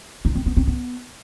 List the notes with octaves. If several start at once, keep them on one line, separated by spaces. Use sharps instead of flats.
D#4
C4
B3
C4
B3